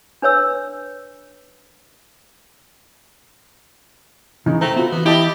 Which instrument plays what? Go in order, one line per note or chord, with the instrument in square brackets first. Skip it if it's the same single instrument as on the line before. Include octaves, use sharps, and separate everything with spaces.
[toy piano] D4 B4 C#5 E6
[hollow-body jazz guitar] C#3 E3 C#4 [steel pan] D#4
[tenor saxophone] A3 [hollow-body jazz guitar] C5 G5 [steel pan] A#5
[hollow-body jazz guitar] B3 F4 F#4 [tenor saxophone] C4
[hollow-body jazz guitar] E3 [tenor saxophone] B3
[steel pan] E4 D#5 A5 [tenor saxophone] G4